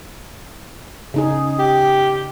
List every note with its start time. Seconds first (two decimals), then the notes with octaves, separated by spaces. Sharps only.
1.14 C#3 D#4 G#4
1.59 G4